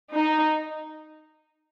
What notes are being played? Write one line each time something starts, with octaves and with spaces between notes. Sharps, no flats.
D#4